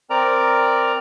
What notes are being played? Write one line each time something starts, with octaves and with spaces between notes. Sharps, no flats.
C4 A#4 D5 A#5